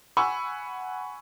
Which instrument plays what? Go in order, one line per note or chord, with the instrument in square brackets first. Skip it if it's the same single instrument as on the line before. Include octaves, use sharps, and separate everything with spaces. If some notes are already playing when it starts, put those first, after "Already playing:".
[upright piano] F#5 G#5 B5 C#6 E6